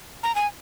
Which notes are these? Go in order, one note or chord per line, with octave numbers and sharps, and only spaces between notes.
A#5
G#5